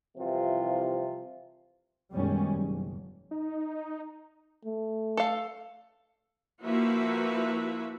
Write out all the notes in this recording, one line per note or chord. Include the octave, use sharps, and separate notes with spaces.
C2 C3 E3 F3 F4
F#2 B2 D#3 G3 G#3 C#4
F#1
D#4
A3
A4 F5
F3 A#3 E4 F#4 B4 E5